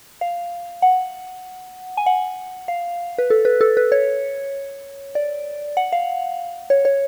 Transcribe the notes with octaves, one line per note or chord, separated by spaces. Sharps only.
F5
F#5
G#5
F#5
F5
B4
A4
B4
A4
B4
C#5
D5
F#5
F5
C#5
C#5